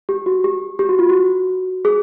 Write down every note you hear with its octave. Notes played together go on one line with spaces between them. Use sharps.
G4
F#4
G4
G4
F#4
F4
F#4
G#4